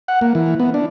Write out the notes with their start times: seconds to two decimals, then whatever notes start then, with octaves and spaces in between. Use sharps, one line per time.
0.08 F#5
0.21 A#3
0.35 E3
0.60 B3
0.74 D4